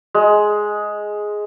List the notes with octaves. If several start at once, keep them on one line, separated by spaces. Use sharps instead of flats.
G#3